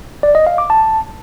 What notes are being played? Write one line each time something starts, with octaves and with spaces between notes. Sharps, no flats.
D5
D#5
F5
D6
A5